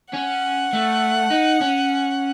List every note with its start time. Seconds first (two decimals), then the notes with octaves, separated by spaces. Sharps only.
0.14 C#4 F#5
0.73 A3
1.30 D#4
1.61 C#4